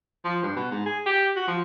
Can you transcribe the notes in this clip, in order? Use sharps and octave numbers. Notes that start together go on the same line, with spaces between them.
F3
G2
B2
G#2
G#4
G4
F#4
F3